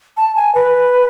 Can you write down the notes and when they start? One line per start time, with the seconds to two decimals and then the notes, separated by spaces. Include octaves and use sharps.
0.17 A5
0.36 G#5
0.55 B4